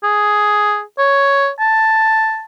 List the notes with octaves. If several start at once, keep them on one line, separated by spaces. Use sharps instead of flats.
G#4
C#5
A5